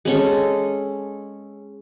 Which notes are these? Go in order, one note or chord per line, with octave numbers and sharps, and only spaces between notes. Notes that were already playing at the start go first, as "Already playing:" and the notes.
G#3 C#4 A4